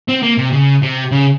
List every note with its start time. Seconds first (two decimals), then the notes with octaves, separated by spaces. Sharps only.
0.08 C4
0.22 A#3
0.37 C3
0.52 C#3
0.82 C3
1.11 C#3